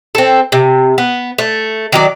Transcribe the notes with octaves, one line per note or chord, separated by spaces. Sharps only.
C4 A4
C3
B3
A3
D#3 F#3 D5